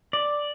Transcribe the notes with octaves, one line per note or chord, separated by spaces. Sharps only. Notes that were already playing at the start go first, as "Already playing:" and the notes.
D5